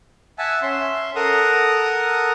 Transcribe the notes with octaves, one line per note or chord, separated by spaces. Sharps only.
E5 F#5 G#5 A5 E6
C#4 E5 C6
A4 A#4 F#5 A#5 D#6